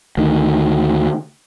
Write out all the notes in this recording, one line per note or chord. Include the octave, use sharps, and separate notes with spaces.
D2 D#3